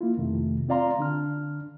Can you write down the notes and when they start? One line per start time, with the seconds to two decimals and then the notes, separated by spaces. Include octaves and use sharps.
0.01 A#3 E4 F4
0.17 F2 C3 D#3 A3
0.68 C4 F4 D5 F5 A#5 C6
0.99 D3 D4 F6